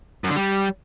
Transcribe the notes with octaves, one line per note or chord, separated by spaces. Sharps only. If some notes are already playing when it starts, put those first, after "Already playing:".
F#2
D3
G3